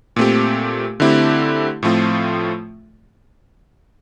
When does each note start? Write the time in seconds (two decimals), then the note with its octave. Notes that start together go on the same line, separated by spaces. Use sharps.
0.16 A#2 A3 C4 G4
1.00 D3 A3 C4 E4 G4
1.83 A2 F3 A3 C4 F4